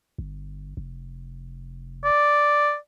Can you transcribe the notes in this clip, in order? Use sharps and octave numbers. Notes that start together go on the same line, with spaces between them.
G1
F1
D5